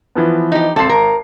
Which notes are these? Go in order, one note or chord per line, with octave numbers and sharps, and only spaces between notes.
E3 F3 B3
D#4 G4
G#1 C4 A4 C7
A#4